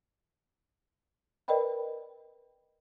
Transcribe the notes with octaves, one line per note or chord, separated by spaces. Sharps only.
A#4 B4 D5 D#5 G5 B5